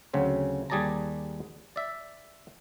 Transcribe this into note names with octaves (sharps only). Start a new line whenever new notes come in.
D2 C#3 F#3 C4
D#2 G3 G#4 D5 A5 A#5
D5 E5